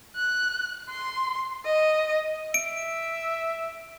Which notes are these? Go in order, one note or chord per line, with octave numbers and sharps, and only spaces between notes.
F#6
C6
D#5
E5 D7